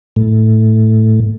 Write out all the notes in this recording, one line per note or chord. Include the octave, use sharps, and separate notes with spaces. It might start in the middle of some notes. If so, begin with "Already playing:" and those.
A2